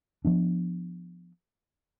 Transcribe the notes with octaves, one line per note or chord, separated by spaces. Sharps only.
F3 B3 D4